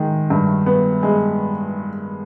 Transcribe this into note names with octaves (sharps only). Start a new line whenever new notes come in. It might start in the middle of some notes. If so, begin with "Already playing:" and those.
Already playing: D#3 G#3
G2
B3
G#3